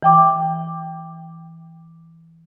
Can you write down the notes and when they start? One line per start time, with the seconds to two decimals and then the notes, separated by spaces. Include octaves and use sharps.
0.03 E3 G5 D6